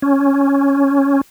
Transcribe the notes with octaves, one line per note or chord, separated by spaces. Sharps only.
C#4